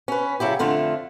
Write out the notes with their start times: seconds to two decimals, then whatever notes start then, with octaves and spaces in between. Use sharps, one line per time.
0.08 C#4 B4
0.40 C#3 F#3 E4 G4
0.59 F2 D3 A3 F4